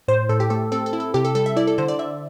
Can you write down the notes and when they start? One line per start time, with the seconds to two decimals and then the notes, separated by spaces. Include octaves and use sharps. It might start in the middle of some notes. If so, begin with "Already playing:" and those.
0.08 A2 C5
0.29 A2 A4
0.40 G4
0.50 A3 A4
0.72 C4 A4
0.86 A4
0.93 E4
1.00 A4
1.14 C3 G4
1.25 A4
1.35 G3 A4
1.46 E5
1.56 E4 D5
1.67 A4
1.78 D3 C5
1.88 D5
1.99 D3 E5